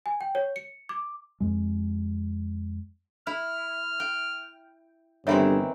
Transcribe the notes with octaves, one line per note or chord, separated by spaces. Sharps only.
G#5
G5
C#5
C#7
D6
F2 G#3
E4 F6
G5
G1 D#3 E3 C4 G#4 C#5 E5